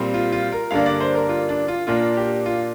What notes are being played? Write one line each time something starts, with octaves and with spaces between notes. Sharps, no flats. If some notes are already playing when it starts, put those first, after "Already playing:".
Already playing: A#2 G3 C4
F4
F4
A#4
G2 D3 A#3 D4 F5
D5
C5
A#4
F4
D4
F4
A#2 A#3 D4 F4
G4
F4